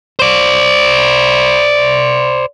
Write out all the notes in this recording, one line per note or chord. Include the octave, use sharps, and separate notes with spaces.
C5 D5